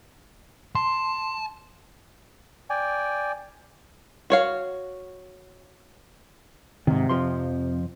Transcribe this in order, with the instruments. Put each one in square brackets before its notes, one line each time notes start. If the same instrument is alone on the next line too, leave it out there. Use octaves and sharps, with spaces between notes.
[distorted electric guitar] A5 [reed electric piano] C6
[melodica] D5 G5 G#5
[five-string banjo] F#4 C#5 F5
[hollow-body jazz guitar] G#2 D#3 [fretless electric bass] C3
[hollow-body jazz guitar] F2 F3 C6